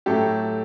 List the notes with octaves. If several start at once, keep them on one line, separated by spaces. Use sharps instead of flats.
A2 F#3 A3 G4 A4